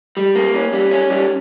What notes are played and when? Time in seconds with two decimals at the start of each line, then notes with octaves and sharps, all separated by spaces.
0.17 G3
0.35 A#3
0.54 C#4
0.73 G3
0.91 C#4
1.10 G3